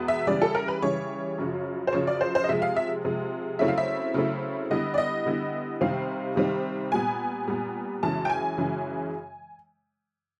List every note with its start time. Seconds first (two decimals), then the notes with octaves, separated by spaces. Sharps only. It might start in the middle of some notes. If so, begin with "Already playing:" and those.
Already playing: E2 B2 G#3 B3
0.08 E5
0.27 C#3 E3 G3 D5
0.42 A4
0.55 A#4
0.68 B4
0.82 C#3 E3 G3 C#5
1.38 F#2 C#3 F3
1.87 C5
1.93 F#2 C#3 F3 C#5
2.07 D5
2.21 C5
2.35 C5
2.44 D#5
2.49 C3 F3 G#3 E5
2.62 F5
2.77 E5
3.05 C3 F3 G#3
3.59 C#3 F#3 A3 C4 E4 E5
3.68 F5
3.78 E5
4.14 C#3 F#3 A3 C4 E4
4.70 D3 G3 B3 E4 D#5
4.94 D5
4.98 D#5
5.26 D3 G3 B3 E4
5.81 C3 D#3 G3 C4 D#4 F5
6.36 C3 D#3 G3 C4 D#4
6.92 A#2 G3 B3 G#5
7.48 A#2 G3 B3
8.03 F#2 C#3 E3 G#3 A5
8.25 G5
8.30 G#5
8.58 F#2 C#3 E3 G#3